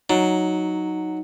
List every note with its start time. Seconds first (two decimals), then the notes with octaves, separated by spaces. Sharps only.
0.10 F#3 D#4